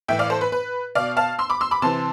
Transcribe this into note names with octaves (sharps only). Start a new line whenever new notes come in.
A2 E3 E5 G5
D5 F5
A4 C5
B4
B4
B2 D5 F5
F5 A5
C6 E6
B5 D6
C6 E6
B5 D6
C3 E3 A5 C6